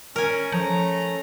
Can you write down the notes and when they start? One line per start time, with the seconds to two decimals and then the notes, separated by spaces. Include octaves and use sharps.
0.16 C#4 A#4 G#5
0.52 F3 A3 C#4 A#5